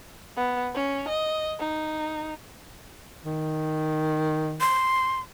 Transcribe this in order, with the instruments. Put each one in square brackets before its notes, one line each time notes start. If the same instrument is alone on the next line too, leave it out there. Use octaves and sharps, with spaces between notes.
[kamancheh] B3
C#4
D#5
D#4
[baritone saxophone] D#3
[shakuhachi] C6